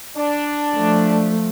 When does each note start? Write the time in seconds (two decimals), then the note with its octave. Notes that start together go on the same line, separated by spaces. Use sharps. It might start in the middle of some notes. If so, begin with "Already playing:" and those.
0.17 D4
0.74 F3 A3